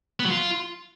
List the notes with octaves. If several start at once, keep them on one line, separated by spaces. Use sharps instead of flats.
B3
F#3
F4